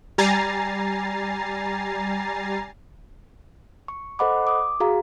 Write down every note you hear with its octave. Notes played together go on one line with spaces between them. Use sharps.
G3 G#5 A#5 A6 C7
C#6
A4 C5 D#5 F#5 B5 D6
D6 D#6
F#4 G#4 F5 A#5